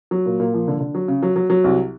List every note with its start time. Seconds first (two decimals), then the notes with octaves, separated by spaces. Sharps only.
0.11 F#3
0.26 A#2
0.40 A#2
0.54 F3
0.68 D3
0.80 D3
0.95 F#3
1.08 C#3
1.23 F#3
1.36 F#3
1.50 F#3
1.64 C2